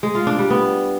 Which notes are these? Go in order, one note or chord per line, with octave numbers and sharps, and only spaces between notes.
G#3
F4
D4
G3
B3